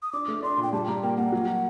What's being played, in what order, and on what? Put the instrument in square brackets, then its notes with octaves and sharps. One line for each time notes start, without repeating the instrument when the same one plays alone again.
[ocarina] D#6
[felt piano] D4 [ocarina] D6
[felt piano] A3
[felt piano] D4 [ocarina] C6
[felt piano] A#2
[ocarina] G5
[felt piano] G3 [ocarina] A5
[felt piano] G3 [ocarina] A#5
[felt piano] A#3 [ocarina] G5
[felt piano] A#3 [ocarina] F#5
[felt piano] F#3